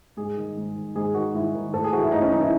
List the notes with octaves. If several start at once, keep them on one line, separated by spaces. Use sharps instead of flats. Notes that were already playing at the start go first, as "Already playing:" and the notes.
G#2 G#4
D#3
G#2
D#3
G#2 G#4
D#3 F#4
G#2 E4
D#3
A2 A4
G#4
E3 F#4
E4
A2 D#4
C#4
E3 D#4
E4